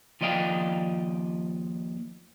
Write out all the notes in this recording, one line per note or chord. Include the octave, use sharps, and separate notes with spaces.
D#2 F3 D5 D#5 F5 G5